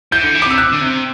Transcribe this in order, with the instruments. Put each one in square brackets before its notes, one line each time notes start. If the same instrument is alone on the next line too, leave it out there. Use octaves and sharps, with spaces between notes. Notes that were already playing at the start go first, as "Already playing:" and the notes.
[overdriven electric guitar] E3 [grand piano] G6
[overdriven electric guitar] D3
E3
[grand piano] D6
[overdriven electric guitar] C3 [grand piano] E6
[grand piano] F#6
[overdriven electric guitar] D3
C3